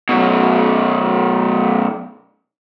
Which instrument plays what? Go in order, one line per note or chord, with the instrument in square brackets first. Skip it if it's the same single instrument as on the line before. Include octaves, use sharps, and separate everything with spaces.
[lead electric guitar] F#2 B2